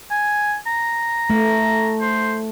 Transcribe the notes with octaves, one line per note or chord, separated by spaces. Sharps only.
G#5
A#5
A3
C5